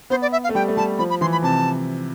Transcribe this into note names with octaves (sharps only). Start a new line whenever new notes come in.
B3 C5
D5
E5
F5
A3
G3 G5
A3
G3 A5
F3 B5
B5
E3 C6
B5
C3 A5